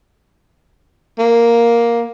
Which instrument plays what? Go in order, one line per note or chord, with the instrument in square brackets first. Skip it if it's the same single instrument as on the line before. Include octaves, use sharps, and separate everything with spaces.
[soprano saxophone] A#3